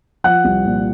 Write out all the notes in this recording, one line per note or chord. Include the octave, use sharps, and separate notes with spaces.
F3 F#5 F#6
C2
A#2